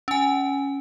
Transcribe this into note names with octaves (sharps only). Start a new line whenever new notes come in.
C#4 G#5